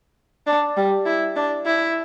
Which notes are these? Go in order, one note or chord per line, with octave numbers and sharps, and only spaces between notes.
D4
G3
E4
D4
E4